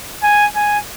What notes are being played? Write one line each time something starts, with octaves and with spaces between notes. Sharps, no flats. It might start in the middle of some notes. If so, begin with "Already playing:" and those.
G#5
G#5